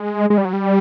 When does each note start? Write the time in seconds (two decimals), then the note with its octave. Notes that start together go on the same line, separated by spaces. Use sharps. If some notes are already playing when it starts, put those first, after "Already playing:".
Already playing: G#3
0.30 G#3
0.38 G3
0.45 F#3
0.53 G3